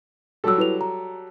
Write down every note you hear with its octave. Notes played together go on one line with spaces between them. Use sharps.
F#3 G3 G4 A4 E6
E4 B4 F7
A#5